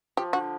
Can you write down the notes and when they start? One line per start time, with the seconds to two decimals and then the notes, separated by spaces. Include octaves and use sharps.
0.17 F3 G4
0.33 D3 F#4